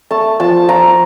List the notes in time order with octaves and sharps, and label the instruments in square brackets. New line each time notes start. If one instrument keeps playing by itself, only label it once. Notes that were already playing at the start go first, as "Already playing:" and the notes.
[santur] A3 A5
F3 A5
F3 A#5